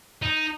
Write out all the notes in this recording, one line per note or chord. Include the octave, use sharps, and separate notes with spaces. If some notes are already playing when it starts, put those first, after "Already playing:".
D#4